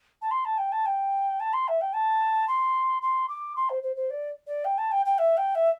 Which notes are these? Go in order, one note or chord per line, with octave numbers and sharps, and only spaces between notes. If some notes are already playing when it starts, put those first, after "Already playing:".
A5
C6
A5
G5
A5
G5
A5
C6
E5
G5
A5
C6
C6
D6
C6
C5
C5
C5
D5
D5
G5
A5
G5
G5
E5
G5
E5